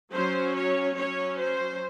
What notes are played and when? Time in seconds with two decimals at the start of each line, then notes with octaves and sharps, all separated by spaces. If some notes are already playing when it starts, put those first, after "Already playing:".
0.13 F#3 C#4 C5
0.55 C#5
0.96 F#3 C#4 C#5
1.38 C5